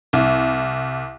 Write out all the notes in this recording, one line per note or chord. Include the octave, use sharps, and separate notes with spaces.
C2